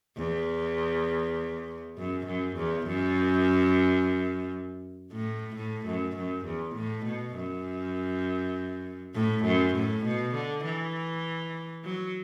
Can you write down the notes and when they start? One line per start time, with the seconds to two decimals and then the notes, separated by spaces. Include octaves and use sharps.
0.17 E2
1.98 F#2
2.27 F#2
2.57 E2
2.87 F#2
5.12 A2
5.56 A2
5.86 F#2
6.17 F#2
6.46 E2
6.76 A2
7.06 B2
7.35 F#2
9.15 A2
9.45 F#2
9.75 A2
10.05 B2
10.35 D3
10.64 E3
11.85 F#3